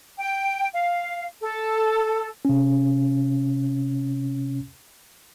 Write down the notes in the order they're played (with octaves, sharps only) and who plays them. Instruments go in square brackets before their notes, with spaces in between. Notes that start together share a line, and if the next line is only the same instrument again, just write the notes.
[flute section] G5
F5
A4
[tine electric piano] C3 C#4